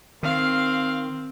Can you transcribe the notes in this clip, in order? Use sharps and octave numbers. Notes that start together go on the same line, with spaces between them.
D#3 C4 F5